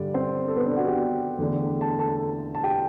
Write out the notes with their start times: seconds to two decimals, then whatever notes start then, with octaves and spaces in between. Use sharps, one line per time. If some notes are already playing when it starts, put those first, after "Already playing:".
Already playing: G2 D3 G3 D4 D5
0.14 C4 C5
0.48 A4
0.56 B3 B4
0.66 D4 D5
0.76 F#4 F#5
0.87 G4 G5
1.38 E2 D3 A3
1.81 A5
1.99 A4 A5
2.55 A5
2.63 G4 G5